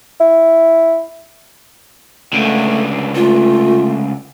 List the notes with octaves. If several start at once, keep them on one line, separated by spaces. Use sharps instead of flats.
E4
C#2 D3 A3
A3 F4